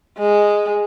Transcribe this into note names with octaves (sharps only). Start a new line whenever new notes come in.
G#3